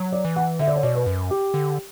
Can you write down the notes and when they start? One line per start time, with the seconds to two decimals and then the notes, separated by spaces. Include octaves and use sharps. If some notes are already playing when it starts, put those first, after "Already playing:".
Already playing: F#3
0.12 D5
0.25 E3
0.36 F#5
0.59 D3 E5
0.67 D5
0.76 C#5
0.83 B2 D5
0.95 B4
1.06 F#2
1.30 G4
1.54 D3